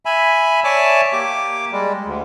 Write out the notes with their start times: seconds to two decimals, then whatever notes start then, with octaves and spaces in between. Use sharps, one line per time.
0.05 E5 G#5 B5
0.64 C#5 D5 E5 G#5 A5 D6
1.13 A#3 G4 D6
1.72 G3 G#3
2.06 D2